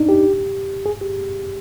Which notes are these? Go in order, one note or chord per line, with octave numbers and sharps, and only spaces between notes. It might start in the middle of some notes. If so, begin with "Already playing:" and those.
Already playing: D4 D#4
G4
G#4
G4